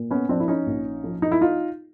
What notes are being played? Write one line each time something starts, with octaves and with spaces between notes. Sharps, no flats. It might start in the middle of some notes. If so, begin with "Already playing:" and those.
Already playing: A#2
B3 C#4
F3 C4 D4
E4
C#4 D#4
A#1
F3
D#4
E4
D#4 F4